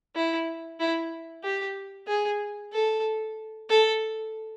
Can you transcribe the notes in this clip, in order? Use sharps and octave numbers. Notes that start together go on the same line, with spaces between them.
E4
E4
G4
G#4
A4
A4